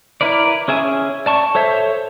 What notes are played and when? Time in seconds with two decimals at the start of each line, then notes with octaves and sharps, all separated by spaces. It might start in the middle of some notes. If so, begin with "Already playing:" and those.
0.21 E4 A#4 B4 D5
0.68 C#4 G#4 E5 G#5
1.26 D5 A5 C#6
1.55 A4 C5 C#5 E5